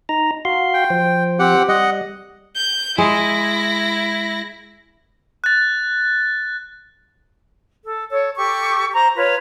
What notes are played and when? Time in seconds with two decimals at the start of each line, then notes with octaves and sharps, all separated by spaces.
0.09 D#4 A#5
0.45 F#4 F5 C6
0.74 G5
0.90 F3 C5
1.39 C4 G4 F#5
1.68 G3 D#5 F#5
2.56 G6
2.98 G#3 E4 A#6
5.44 F#6 A6
7.84 A4
8.10 A4 C#5
8.37 G4 A4 C#6 D6
8.93 C5 A#5
9.16 F4 B4 C#5